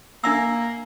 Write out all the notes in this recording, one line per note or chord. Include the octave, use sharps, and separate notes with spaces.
A#3 D4 E5 E6